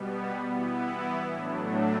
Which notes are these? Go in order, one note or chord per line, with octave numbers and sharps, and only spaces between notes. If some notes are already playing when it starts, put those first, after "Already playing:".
Already playing: B2 G3 B3
E3 B3 E4
A2 F#3 A3 D4